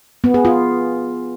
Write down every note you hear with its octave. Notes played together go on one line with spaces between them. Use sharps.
B3
G#4
F4